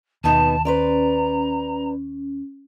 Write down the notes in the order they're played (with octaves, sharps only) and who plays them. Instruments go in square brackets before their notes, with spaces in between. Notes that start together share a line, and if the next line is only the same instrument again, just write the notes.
[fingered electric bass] D#2 [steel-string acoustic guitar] B2 B3 D#4 [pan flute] A5
[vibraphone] C#4 [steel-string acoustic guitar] B4 C5 D5 [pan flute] A#5